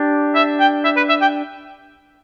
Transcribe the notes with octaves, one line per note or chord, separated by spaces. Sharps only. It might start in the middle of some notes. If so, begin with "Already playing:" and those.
Already playing: D4 G4
E5
G5
E5
B4
E5
G5